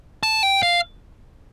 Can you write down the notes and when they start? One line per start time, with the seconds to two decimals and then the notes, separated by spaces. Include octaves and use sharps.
0.23 A5
0.43 G5
0.63 F5